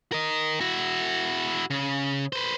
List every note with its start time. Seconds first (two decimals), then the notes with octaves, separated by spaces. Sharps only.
0.12 A#4 D#5
0.61 E4 F#4
1.70 C#3
2.33 B4 C5